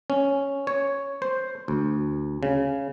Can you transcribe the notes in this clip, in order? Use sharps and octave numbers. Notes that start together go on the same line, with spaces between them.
C#4
C#5
C5
D2
C#3